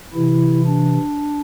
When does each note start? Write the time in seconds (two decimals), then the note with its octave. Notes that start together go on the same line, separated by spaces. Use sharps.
0.13 C3 E3 E4
0.66 D4